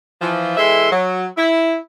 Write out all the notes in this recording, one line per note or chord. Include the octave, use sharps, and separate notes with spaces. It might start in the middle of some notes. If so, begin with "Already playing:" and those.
E3 F3
E3 G#3 A4 E5 C6
F#3
E4